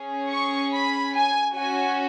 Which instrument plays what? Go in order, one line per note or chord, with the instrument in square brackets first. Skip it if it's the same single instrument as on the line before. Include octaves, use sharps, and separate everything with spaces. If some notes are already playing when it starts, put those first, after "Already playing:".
Already playing: [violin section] C#4 G#4
C#6
B5
G#5
C#4 F#4 G#5